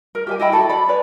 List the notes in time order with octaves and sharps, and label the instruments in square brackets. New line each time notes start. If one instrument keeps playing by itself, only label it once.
[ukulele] A#4
G4 E5 G#5
E4 D#5 G5 B5
E4 F#4 A4
D5 B5
B4 C#5 D5 G#5